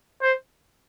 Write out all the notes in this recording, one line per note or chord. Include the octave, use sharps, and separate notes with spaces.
C5